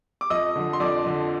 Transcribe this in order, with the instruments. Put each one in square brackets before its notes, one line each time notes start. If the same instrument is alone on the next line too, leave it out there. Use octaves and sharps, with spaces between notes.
[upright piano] D6
F2 D#5 D#6
D3 F3
C6
F2 D5 D6
D3 F3